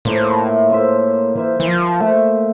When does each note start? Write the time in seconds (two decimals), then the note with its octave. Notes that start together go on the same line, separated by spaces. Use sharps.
0.05 A2 A#3 F4 C5 E5
0.70 A#3 F4 C5 E5
1.35 E3 A#3 F4 C5 E5
1.60 E3
1.68 F3
2.00 A3 A#3 F4 C5 E5